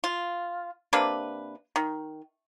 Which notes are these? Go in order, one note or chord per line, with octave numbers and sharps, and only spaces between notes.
F4
C3 A#3 D4 B4
D#3